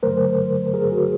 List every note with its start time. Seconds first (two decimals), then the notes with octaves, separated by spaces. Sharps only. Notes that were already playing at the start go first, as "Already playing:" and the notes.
0.03 G2 D3 F#3 A3 A#4 C5
0.74 G#4 A#4
0.92 F#4